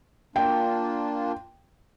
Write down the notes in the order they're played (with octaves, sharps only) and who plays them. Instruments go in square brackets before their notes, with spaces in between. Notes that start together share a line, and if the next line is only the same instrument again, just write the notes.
[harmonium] A#3 D4 F4 [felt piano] G5